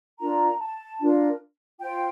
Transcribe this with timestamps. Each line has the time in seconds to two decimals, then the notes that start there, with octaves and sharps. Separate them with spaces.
0.19 D4 F4 A#4 A#5
0.60 A5
1.00 D4 F4 A#4
1.80 F4 C5 G5